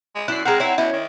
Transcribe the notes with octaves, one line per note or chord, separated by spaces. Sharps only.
G#3
F#2 E4 F#6 C7
G#3 C4 A#4 F#5 A#5
E4 C#5
B2 C#4 E4
D#3